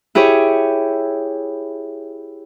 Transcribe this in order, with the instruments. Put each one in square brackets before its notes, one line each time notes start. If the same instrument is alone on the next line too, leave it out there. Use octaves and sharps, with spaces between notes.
[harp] E4 G4 G#4 C#5 C#6